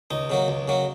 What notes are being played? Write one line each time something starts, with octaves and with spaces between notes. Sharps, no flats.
C#2 D#4
C#3 F#3 A#3
C#2
C#3 F#3 A#3